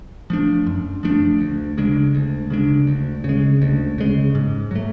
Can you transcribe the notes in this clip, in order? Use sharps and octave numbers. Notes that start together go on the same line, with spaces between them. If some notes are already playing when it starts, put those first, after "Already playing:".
F3 A3 D4
F#2
F3 A3 D4
D2
C#3 G#3 D4
D2
C#3 G#3 D4
D2
C#3 G#3
D2
C#3 G#3
G#2
F#3 A3